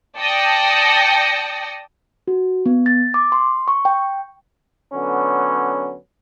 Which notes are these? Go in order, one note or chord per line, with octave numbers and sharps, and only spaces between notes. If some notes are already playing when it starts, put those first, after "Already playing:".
D5 G5 A5 D#6 A#6 C#7
F#4
B3
A6
D6
C6
C#6
G5
D3 F#3 B3 C#4